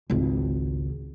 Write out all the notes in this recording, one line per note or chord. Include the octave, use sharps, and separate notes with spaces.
G#1 C#2